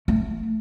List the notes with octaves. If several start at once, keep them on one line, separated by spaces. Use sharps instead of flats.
A3